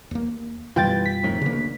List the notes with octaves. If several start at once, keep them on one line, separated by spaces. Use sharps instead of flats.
D#2 A#3
F#2 B2 E3 G3 F4 G5 A6
B6
F2 A2 D#3
D2 C#3 A#3